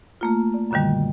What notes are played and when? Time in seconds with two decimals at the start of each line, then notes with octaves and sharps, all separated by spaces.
0.21 A3 A#3 F4
0.54 D5
0.71 F#2 A#2 D3 D#3 G3